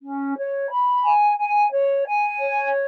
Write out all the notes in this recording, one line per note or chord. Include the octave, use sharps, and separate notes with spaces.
C#4
C#5
B5
G#5
G#5
C#5
G#5
C#5